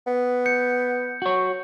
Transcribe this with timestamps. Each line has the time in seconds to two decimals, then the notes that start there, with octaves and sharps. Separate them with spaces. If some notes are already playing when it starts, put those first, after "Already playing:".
0.07 B3
0.46 G6 C#7
1.22 F#4 C#5